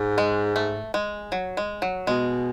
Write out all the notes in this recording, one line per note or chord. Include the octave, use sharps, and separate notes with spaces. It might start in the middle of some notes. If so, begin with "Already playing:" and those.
Already playing: G#2
G#3
A3
G#3
F#3
G#3
F#3
B2 G#3